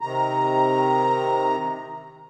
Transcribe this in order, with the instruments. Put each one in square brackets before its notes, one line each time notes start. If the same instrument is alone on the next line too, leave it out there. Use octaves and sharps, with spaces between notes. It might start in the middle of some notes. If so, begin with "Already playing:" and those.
[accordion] C3 D#3 A#5